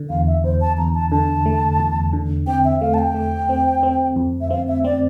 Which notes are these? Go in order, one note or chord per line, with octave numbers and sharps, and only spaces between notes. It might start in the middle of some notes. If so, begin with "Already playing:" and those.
Already playing: D3
E2 F5
E5
E2 C5
A5
E2 A#5
A5
D3 A5
A3
E2
D3
C4 G5
E5
A3 F5
A5
G5
A3
C4
C4
F2
E5
C4 F5
E5
C4 D5